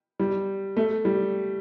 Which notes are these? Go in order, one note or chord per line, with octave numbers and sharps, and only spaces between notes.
G3
A3
G3